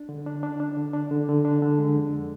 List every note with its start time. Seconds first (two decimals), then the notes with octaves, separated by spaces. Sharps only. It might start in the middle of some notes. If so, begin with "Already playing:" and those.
Already playing: D4
0.09 D3
0.26 D4
0.43 D4
0.60 D4
0.77 D3
0.93 D4
1.11 D3
1.28 D3
1.45 D4
1.62 D3
1.78 G#3
1.96 F2